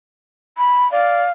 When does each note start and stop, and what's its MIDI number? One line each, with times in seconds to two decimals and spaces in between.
0.57 0.90 83
0.92 1.23 74
0.92 1.31 77